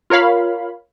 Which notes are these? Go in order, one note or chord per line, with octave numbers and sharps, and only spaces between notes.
F4 A#4 C#5 F5 B5